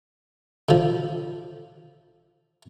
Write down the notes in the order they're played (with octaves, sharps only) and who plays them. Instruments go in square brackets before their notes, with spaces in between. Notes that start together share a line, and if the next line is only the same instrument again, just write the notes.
[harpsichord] D3 F3